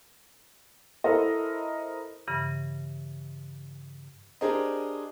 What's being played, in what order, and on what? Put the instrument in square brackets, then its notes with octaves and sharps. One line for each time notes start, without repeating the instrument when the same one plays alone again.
[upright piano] E4 A4 A#4 C5 D#5
[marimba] G2 C#3 E3
[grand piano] D4 G4 G#4 A#4 C5 D#5